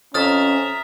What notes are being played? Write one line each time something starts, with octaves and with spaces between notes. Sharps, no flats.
F2 C#4 E5 A#5 D#6 F6 A6